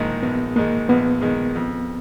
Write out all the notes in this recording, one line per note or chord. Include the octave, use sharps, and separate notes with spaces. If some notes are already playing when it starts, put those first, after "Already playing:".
Already playing: A#1 G#2 D#3 G#3 A#3
A#1 B3
G#2 D#3 G#3 A#3
A#1 B3
G#2 D#3 G#3
F2